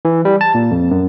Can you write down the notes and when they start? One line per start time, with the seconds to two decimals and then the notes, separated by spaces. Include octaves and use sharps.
0.05 E3
0.25 G3
0.41 A5
0.54 A#2
0.71 F2
0.91 F#2